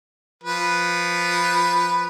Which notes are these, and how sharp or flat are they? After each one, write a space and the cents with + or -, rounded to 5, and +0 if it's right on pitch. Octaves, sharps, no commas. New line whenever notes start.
F3 +0 B4 +0